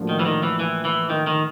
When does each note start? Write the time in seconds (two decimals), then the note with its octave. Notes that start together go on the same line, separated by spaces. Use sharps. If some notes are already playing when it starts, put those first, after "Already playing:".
Already playing: A2 F3 A#3 D4 F#4
0.09 D#3
0.19 E3
0.25 D#3
0.43 E3
0.59 E3
0.85 E3
1.10 D#3
1.27 D#3